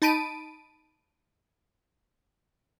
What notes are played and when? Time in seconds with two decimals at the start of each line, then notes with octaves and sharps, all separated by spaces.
0.02 D#4 A5 B5 D7 D#7